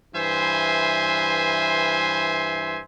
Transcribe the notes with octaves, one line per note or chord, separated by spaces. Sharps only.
G2 E3 C5 E5 G#5 C6